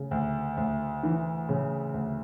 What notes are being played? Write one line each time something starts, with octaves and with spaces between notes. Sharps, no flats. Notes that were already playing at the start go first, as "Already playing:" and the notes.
Already playing: D2 C#3
D2
D2
E3
C#3
D2